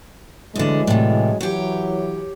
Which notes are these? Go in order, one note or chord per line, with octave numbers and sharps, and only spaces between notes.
D2 D3 E3 F#3 G#3
A2 C3
E3 F#3 G4 C#5